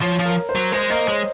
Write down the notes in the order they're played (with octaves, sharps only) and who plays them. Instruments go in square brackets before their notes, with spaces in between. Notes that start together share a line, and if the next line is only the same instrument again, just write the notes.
[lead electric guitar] F3 [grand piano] C#5
[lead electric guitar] F3
[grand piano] A#4
C5
[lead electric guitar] F#3
[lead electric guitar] G#3 [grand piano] C5
[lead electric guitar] A#3 [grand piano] D#5
[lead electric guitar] G#3 [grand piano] C#5